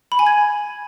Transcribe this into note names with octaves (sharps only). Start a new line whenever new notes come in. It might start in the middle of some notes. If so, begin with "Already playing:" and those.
B5
G#5
G#6